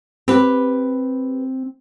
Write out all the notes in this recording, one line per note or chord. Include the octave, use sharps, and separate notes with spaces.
C4 G4 B4